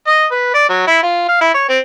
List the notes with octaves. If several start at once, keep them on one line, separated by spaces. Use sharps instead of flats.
D#5
B4
D5
F#3
E4
F4
F5
E4
C#5
C4